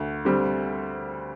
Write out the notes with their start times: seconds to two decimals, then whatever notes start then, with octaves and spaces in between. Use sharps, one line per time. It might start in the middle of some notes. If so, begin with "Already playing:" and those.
Already playing: D2
0.25 D3 G3 C4